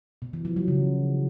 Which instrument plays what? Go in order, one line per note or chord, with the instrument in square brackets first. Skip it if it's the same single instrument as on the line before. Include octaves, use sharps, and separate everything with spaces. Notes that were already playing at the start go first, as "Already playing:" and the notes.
[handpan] B2
E3
F3
F#3
C#3